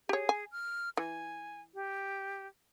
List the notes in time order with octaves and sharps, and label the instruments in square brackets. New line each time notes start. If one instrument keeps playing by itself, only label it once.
[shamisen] G4 C#5 [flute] G#4
[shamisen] G#5
[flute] F6
[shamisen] E3 [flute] G#5
[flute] G4